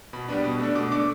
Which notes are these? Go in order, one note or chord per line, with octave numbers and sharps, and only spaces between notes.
B2 B5
G3 B3 D4
B2
A3 D4
B2 D6
A3 D4 D6